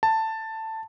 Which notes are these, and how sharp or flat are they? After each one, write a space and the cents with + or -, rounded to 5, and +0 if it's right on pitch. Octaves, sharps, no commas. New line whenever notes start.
A5 +10